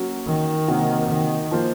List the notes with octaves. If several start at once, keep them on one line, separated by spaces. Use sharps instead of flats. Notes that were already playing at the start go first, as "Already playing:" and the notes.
Already playing: F#3 A#3 C#4 F#4
D#3
C3 F#3 A#3 D#4 F#4
D#3
F3 A#3 F4 C5